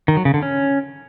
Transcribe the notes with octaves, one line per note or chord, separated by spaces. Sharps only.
D#3
F#3
C#3
D3
C#4